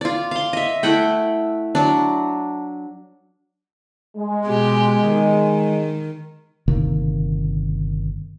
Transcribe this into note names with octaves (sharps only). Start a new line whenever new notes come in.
F4 D5
F5 C6
D#5 E5
A3 E4 F#5 G5
F#3 D4
G#3
B2 B3 G4
D#3
G1 C3 D#3 A#3